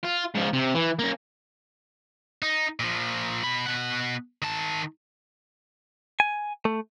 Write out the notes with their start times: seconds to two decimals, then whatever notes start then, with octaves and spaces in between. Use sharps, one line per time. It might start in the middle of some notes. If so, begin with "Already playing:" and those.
0.05 F4
0.35 G#2 F3
0.53 C3
0.75 E3
0.99 A#3 C#4
2.42 D#4
2.80 A#2 F3
3.43 B2 B5
3.66 B2 F#5
4.42 D#3 A5
6.20 G#5
6.65 A3